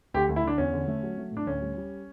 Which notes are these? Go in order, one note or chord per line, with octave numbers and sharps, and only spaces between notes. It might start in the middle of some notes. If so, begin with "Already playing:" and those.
D2 G4
D2
E4
D3 D4
E2 C#4
D3
A3
F#3
A3
A2 D4
D2 C#4
G3
G3